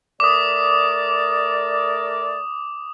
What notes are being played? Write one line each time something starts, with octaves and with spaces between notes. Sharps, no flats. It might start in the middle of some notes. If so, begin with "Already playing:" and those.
A3 A#4 D5 D6 D#6